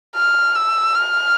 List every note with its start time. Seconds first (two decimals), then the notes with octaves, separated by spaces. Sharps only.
0.16 F6
0.55 E6
0.95 F6